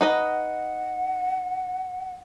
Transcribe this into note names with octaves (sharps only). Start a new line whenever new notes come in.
D#4 B4 D#5 F#5